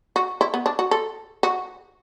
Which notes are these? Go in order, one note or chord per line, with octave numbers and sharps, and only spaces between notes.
F#4
E4
B3
D4
F#4
A4
F#4